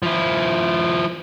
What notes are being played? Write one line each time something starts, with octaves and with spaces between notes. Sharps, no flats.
F3 E4